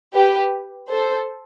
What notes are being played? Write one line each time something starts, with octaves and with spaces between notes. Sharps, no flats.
G4 B4
A4 C5